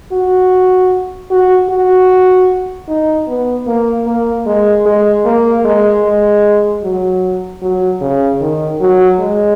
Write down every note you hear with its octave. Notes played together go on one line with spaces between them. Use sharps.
F#4
F#4
F#4
D#4
B3
A#3
A#3
G#3
G#3
A#3
G#3
G#3
F#3
F#3
C#3
D#3
F#3
G#3